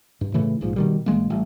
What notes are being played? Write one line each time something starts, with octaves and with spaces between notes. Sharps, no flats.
G2
A2 C#3 E3 A3
A#1 G#2 F3
B2 D#3 G3
A#1 E3 G#3 A#3
A1 G3